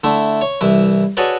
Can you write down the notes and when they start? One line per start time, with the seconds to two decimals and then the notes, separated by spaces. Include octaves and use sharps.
0.04 D3 A3 E4
0.41 C#5
0.61 C2 E3 E4
1.17 F#4 G#4 A4 B4 C#5 D5